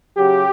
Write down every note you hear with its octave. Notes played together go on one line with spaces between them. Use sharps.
C#3 F#3 G4